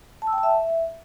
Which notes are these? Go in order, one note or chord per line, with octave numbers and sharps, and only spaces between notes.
A5
E6
G5
A5
E5